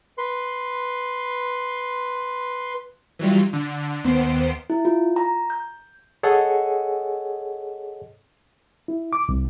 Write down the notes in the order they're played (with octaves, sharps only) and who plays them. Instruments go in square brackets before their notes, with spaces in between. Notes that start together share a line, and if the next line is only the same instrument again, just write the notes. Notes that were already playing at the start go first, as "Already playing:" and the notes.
[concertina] B4 C6
[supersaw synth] E3 F#3 G3 F4
D3
D#2 B3 C5 C7 D7
[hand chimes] E4
F4
A#5
G6
[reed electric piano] G#4 A4 C#5 D#5 F#5 G#5
E4
D6
C2